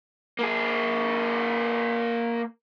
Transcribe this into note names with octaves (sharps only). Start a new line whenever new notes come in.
A#3 G#4